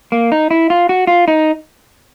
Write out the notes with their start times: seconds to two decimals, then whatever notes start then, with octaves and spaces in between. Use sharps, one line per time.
0.12 A#3
0.32 D#4
0.51 E4
0.70 F4
0.89 F#4
1.07 F4
1.28 D#4